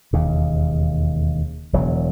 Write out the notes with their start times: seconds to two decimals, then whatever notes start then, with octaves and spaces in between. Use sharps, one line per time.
0.13 E1 D#2 C#3
1.73 E1 E2 C#3 F#3